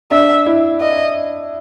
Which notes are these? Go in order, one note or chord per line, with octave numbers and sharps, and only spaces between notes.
D4 E5
E4
D#5